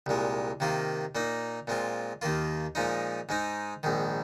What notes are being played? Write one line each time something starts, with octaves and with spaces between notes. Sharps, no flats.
C2 A#2 G#3
C3 D#3 A#3 F4
A#2 A#3 D#4
A#2 G#3 C4 F4
D#2 D#3 A#3 F4
A#2 F3 G#3 D#4
G#2 G#3 D#4
A#1 G#2 D#3